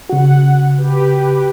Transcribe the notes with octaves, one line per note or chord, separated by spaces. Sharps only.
C#3 F#4 F#5
G4 B4